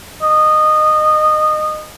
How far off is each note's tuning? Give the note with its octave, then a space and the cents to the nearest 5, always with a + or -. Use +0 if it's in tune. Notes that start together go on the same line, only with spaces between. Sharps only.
D#5 -20